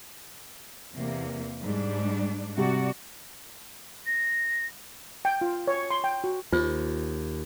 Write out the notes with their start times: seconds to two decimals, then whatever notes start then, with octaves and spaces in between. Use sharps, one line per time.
0.95 E2 C3 A#3
1.62 G#2 G3 D4
2.57 C3 G3 F#4 G4 D5
4.06 A#6
5.25 G5
5.41 F4
5.67 C#5
5.91 C6
6.04 G5
6.24 F#4
6.52 D#2 F4 C5